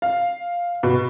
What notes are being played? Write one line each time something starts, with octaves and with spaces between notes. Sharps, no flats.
F5
B2